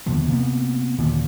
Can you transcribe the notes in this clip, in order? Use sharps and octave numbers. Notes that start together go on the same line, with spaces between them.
D#2 B2 D3 F3
C3 A#3 B3
D#2 A#2 D3